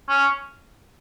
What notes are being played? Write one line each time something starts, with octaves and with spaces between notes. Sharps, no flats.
C#4